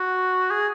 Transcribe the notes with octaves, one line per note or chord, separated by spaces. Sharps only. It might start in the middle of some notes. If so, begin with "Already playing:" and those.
Already playing: F#4
G#4